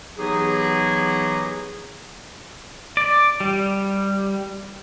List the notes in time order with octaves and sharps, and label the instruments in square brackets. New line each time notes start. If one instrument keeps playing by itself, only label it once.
[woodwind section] E3 F#3 B3 D#4 G4 G#4
[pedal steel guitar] D5
G3